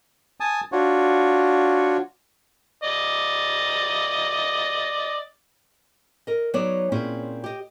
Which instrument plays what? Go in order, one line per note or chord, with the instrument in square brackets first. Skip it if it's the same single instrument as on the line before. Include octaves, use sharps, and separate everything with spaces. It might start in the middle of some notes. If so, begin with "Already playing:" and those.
[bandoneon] G#5 A5 D#6
D4 F4 F#4 C#5
[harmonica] D5 D#5
[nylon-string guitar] A#4 D#5
F#3 B3 D#4 C#5 D5
A#2 C4 C#4 E4 G#4
G4 D#5